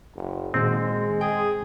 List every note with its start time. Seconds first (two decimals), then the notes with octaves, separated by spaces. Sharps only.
0.15 F#1
0.54 A#2 D#3 G#3 C4 F#4
1.21 G#4 G5